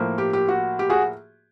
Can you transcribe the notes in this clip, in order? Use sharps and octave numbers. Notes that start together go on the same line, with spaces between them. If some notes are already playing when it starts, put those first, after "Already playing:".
Already playing: A2 F3 A#3
G4
G4
F#4
G4
F#4 G#4